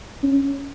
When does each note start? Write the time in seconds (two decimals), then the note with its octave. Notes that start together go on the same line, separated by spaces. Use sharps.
0.23 C#4